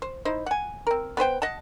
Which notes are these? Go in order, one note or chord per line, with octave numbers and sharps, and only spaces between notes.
C5
D#4 E4 C5
F#5 G#5
C4 A#4
B3 B4 C5 G5
D#5 F#5 A5